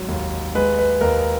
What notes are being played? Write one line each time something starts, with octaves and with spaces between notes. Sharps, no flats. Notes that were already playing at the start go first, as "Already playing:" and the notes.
Already playing: G#1 F#3
D#2
G#3 B4
B4
D#2 A#4